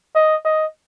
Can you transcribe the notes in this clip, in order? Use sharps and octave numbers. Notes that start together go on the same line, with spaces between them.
D#5
D#5